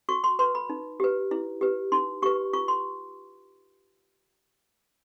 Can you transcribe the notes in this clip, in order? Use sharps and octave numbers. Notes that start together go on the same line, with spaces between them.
F#4 C#6
C6
B4 C6
B5
D#4
G4 B4
E4
G4 B4
D#4 C6
G4 B4 C#6
F4 C#6
C6